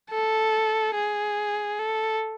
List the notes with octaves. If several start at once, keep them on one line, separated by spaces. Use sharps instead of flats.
A4
G#4
A4